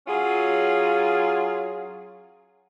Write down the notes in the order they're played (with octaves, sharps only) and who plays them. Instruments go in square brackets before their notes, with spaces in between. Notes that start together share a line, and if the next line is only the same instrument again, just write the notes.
[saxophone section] F#3 C#4 F4 G#4